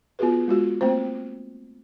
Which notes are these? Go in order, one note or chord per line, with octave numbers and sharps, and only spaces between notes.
B3 F4 F#4 G#4 B4
G#3 F4 F#4
A3 A#3 C4 C5